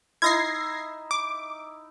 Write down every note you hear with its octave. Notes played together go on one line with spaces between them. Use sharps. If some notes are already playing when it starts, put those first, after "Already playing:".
D#4 E4 G#6 A#6 C7
D6